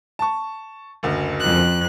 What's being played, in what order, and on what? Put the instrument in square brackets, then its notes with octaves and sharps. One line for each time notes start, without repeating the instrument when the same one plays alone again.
[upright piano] A5 C#6
F#1 D2
[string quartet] F2 F#6